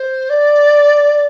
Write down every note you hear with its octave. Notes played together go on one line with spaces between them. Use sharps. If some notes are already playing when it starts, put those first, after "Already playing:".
Already playing: C5
D5